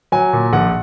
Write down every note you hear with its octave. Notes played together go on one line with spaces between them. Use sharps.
F#3 G#5
A#2
A#1 F#5